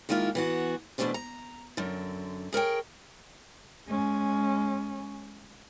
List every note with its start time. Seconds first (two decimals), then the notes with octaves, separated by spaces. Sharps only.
0.09 D#3 G#3 A#3 E4 F4
0.35 E3 B3 F#4
0.98 E2 B2 F#3 A3 D4 C5
1.14 A#5
1.77 F#2 D3
2.53 G#4 A#4 C#5 G5
3.88 G#3 C#4